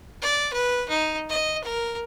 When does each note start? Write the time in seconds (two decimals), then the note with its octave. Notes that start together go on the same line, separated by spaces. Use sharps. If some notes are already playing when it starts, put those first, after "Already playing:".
0.22 D5
0.53 B4
0.89 D#4
1.29 D#5
1.64 A#4